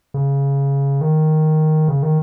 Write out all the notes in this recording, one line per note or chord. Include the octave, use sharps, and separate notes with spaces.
C#3
D#3
C#3
D#3